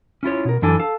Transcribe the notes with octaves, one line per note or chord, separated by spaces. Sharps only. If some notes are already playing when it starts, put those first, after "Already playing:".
C#4 E4 F4 C#5
B2 A#4
F#2 E3 D4 A4 G#5
A4 F5